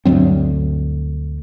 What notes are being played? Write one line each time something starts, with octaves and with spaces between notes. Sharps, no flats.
D2 G2 F#3 C4